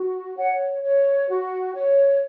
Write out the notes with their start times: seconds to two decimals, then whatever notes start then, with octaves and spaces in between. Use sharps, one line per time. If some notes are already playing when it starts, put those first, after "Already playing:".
Already playing: F#4
0.37 C#5 F#5
0.84 C#5
1.29 F#4
1.75 C#5